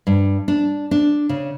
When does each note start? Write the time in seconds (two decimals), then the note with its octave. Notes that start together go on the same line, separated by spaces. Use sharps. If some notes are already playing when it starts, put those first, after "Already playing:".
0.07 G2
0.48 D4
0.91 D4
1.29 C#3